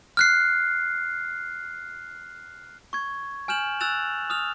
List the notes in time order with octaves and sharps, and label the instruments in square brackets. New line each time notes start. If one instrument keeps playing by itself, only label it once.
[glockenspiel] F6 F#6 C7
C#6 G#6
G#5 F6 G6 E7 F#7
E6 F#6 A6 E7 F7
D#6 F6 F7